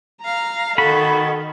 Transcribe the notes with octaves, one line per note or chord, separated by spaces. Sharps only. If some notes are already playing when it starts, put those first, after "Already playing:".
F5 A#5
D#3 F#4 A4 B5